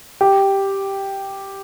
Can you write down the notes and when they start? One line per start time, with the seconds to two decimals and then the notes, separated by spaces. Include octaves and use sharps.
0.21 G4